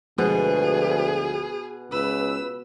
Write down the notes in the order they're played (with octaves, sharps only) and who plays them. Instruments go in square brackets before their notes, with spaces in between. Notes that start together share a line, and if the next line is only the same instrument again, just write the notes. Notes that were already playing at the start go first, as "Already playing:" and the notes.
[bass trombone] D2 [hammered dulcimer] B2 [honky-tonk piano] F3 G#3 B3 [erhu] G#4
[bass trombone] C#2 [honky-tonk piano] B4 [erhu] E6